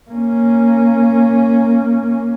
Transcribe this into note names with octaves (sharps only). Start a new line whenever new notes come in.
A#3 C#4